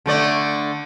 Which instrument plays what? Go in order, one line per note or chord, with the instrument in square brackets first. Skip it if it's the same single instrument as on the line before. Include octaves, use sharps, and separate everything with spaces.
[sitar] D3 A3 D5